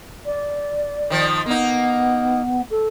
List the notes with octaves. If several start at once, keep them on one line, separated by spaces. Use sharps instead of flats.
D5
D#3 F3
A#3 B3 D#4
A4